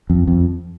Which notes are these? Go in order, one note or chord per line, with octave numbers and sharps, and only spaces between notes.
F2
F2